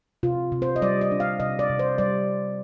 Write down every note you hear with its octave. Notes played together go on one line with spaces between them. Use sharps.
C3 F4
C3
C5
D#5
G3 D5
D#5
D4
F5
C3 D#5
D5
C3
C5
G3 D5